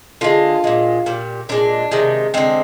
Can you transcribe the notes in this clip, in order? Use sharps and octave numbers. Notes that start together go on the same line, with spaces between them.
D3 G#3 F4
A#2 G#3
A#2 G3
A#2 G#3 D4
C3 D#3 G#3
D3 G#3 C4